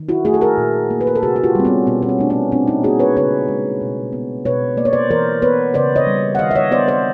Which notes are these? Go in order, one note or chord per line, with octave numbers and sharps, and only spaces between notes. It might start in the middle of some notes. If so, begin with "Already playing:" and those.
Already playing: D#3
E4 F#4
A3 F#4 G#4
A4
G#4 A#4
A#2
A#3
B4
A#4
A4
C3 F#4 G#4
F#4
F4 G4
G3 C4
B3 C#4
B2 B3
C#4
C4
A3 D4
B3 C#4
A#2 C4 D4
C#4 D#4
A#3 F#4 G#4
B4 C#5
C#3 B4 C#5
G#3
B2
B3
B2 B4 C#5
A#3 D5
C#5
C5 D5
E3 A#4 C5
B3 B4 C#5
C#3 C5 D5
C#5 D#5
G3
F#5
D#3 D#5 F5
E5
C#5 D#5
B3 C5 D5
C5 D5